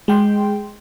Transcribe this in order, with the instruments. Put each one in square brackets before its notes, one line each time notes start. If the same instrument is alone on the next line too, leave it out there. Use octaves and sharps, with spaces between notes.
[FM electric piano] G#3 G5 C6